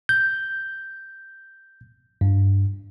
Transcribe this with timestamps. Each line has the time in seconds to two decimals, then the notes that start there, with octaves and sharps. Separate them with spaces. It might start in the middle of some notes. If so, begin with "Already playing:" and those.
0.09 G6
2.21 G2